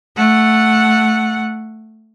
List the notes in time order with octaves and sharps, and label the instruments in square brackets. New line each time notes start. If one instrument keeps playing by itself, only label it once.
[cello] A3 F#5